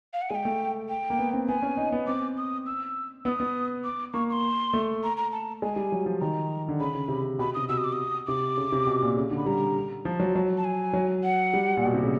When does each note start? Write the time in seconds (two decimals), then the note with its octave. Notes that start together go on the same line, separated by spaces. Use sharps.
0.13 F5
0.22 F#5
0.30 G#3 G#5
0.35 G5
0.45 A3
0.89 G5
1.10 A#3
1.19 B3
1.33 C4
1.48 B3 G#5
1.62 C#4
1.77 D#4
1.92 B3
2.07 C4 D6
2.37 D#6
2.66 E6
3.25 B3 E6
3.28 D#6
3.40 B3
3.84 D6
4.14 A#3 C#6
4.29 C#6
4.33 C6
4.74 A3
5.04 A#5
5.17 A#5
5.32 A5
5.62 G#3 G#5
5.76 G3
5.92 F#3
6.06 F3
6.21 D#3 A#5
6.69 D3
6.80 C#3 B5
6.95 C#3
7.08 C3
7.22 C#3
7.39 B2 B5
7.54 C3 D#6
7.69 B2 E6
7.77 D#6
7.84 D6
7.93 D#6
8.27 C3 D6
8.57 C#3
8.72 C3
8.87 B2
9.02 A#2
9.17 C#3
9.31 D3
9.37 B5
9.46 G3 A#5
10.05 F3 A5
10.20 F#3
10.35 F#3
10.58 A5
10.65 G#5
10.93 F#3
11.24 F#5
11.54 G3
11.77 A#2
11.85 B2
11.94 C3
12.03 C#3